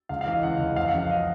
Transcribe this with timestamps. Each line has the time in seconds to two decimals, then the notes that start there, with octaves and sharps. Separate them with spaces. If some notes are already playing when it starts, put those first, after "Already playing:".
0.09 C#2 F5
0.21 F5
0.26 E3
0.31 D#5
0.43 C#2 F#5
0.60 C#2
0.76 F2 F5
0.88 F#5
0.93 C#3
0.98 F5
1.10 D#5